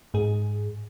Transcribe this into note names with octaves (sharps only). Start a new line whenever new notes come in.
G#2 G#4